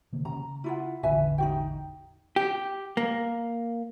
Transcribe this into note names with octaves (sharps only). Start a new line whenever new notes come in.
C3 D#3 A#3
C#3 A#5
E4 F4 F#5
E1 A1 D3 B4 E5 G#5
D#4 F#4 G5
G4
A#3